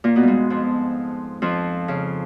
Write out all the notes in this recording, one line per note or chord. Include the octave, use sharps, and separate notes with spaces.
A#2 A#3
B2 B3
G#2 G3 G#3
F2 F3
F2 F3
C#3